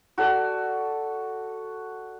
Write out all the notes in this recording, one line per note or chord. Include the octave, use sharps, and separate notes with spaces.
F#4 A4 D5